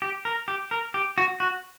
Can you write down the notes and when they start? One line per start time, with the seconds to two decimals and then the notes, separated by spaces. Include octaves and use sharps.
0.02 G4
0.25 A#4
0.48 G4
0.71 A#4
0.94 G4
1.18 F#4
1.40 F#4